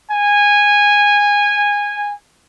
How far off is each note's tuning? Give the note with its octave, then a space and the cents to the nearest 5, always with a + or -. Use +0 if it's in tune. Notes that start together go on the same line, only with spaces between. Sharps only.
G#5 -15